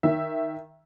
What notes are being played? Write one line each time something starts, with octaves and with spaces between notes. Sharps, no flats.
D#3 E5